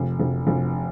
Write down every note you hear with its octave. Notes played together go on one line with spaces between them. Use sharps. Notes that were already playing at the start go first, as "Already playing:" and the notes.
Already playing: F1
F1
F1